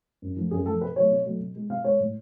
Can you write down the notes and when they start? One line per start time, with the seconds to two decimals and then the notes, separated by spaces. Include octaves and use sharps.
0.22 F#2
0.37 F3 A3
0.51 F#2 G#4
0.66 F3 A3 A4
0.81 B2 B4
0.96 F#3 A3 C#5
1.11 B2
1.25 F#3 A3
1.40 B2
1.56 G#3
1.70 B2 F5
1.84 G#3 C#5
2.00 A2